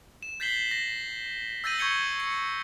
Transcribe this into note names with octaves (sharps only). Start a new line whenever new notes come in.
E7
G6 A6 B6 C7 F#7 G7
A#6
E6 G6 A6 A#6 D#7 F#7
C#6 G6 G#6 C#7 G7
C#7